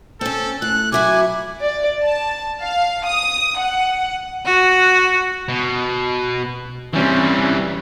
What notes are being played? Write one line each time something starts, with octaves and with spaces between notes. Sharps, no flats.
C4 C#4 A4
A2 F#6
F#3 E4 F#4 G#5 D6
D5
A5
F5
D#6
F#5
F#4
B2
E3 G3 C4 C#4